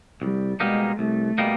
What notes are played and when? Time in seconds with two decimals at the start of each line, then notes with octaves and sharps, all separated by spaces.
0.21 C2 G3
0.60 B2 G3 G#3 A#3 D#4
0.99 C2 A3
1.38 B2 G3 A#3 D#4